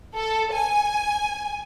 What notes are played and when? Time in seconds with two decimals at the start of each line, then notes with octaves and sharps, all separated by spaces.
0.14 A4
0.53 G#5